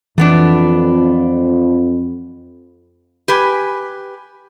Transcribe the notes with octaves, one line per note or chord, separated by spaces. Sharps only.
F2 E3 A3 B3 D4
G4 B4 G#5